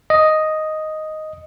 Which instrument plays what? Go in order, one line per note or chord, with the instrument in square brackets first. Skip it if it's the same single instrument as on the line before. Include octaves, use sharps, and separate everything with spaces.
[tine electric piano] D#5